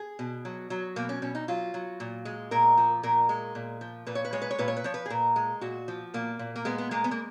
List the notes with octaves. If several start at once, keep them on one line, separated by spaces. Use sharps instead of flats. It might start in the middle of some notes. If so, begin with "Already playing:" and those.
Already playing: G#4
B2
F#3
F#3
B2 A#3
C#4
B2 C#4
D#4
F#3 F4
F#3
A#2
G#3
A#2 A#4
F3
A#2 A#4
G#3
A#2
F3
A#2 B4
C#5
B4
G#3 C#5
B4
C#5
A#2 B4
C#5
B4
F3 C#5
B4
G#4
A#2 A#4
G#3
A#2 F#4
F3
A#2 A#3
A#2
A#3
G#3 B3
B3
G#3 A#3
B3
A#3